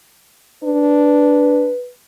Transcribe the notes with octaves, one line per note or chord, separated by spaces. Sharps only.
D4 B4